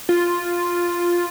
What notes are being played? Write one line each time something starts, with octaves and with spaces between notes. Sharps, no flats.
F4